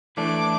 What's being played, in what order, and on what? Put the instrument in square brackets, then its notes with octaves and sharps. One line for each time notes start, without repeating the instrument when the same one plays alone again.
[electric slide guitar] E3 A3 D4 [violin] D6